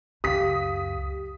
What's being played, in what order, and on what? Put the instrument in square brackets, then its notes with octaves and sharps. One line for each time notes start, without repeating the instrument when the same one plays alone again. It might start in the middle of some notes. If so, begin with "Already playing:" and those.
[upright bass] C#2 F#2 [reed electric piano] G4 F5 [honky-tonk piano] D#6 B6